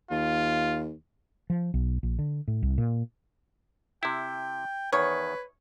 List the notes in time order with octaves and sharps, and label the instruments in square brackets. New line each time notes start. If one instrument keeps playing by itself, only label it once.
[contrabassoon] D#2 [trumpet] F4
[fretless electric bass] F3
B1
A#1
D3
A2
C2
A#2
[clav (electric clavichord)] C3 E4 [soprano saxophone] G5
[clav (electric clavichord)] E2 D#3 [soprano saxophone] B4 [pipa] C#5